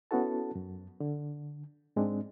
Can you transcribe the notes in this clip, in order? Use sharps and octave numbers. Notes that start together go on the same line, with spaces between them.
B3 C#4 E4 F#4 A4 A5
F#2
D3
G#2 G#3 C4 D4